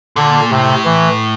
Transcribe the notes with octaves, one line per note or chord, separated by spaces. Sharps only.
A#2 D3
A2 C3
E3